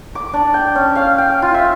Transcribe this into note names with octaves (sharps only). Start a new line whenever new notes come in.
D6
D4
G5
C#4
F5
G5
F4
E5